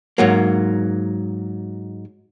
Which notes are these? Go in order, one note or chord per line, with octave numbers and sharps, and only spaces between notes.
G#2 F#3 A#3